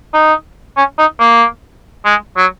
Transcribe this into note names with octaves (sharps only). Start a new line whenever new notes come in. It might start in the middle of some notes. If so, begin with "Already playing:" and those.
D#4
C#4
D#4
A#3
G#3
F#3